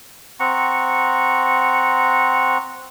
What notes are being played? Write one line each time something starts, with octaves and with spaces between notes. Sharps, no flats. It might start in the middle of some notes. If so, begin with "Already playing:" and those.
C4 F#5 A#5 C#6